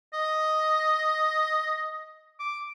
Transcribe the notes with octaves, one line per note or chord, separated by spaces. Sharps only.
D#5
D6